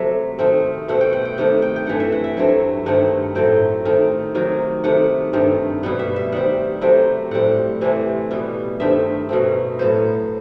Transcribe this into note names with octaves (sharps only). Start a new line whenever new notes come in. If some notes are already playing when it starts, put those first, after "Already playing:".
Already playing: C3 F#3 A3 E5
D#3 A3 C4
B2 A3 C4 F#5
G5
F#5
G5
C3 D#3 A3 F#5
G5
G5
G2 E3 A3 F#5
E5
F#5
E5
G2 F#3 A3 C4
G2 D#3 A3 C4 F#5
A2 F#3 A3 C4 G5
D#3 A3 C4
C3 D#3 F#3
C3 D#3 A3 F#5
G2 D#3 A3 C4
B2 G3 B3 F#5
E5
E5
D#3 G3 C4 F#5
C3 F#3 A3 C4 G5
A2 G3 C4 F#5
C3 E3 A3 C4
B2 G3 B3
G2 D#3 A3 C4 E5
B2 F#3 A3 C4
A2 F#3 B3 C5